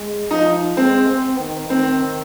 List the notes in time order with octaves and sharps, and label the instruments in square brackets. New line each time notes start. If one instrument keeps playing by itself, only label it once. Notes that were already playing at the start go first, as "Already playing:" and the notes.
Already playing: [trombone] G#3
[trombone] F3 [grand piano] D#4
[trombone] G#3 [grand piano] C4
[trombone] C4
D#3
[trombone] D#3 [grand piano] C4